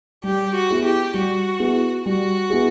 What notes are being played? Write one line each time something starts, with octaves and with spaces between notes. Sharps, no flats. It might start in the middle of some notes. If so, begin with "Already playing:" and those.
G3 G4
F#4
B3 E4 G#4
G4
G3 F#4
B3 E4 G#4
G3 F#4
B3 E4 G#4